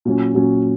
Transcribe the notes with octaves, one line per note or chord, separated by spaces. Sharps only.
A#2 F#3 C#4
A#2 F#3 C#4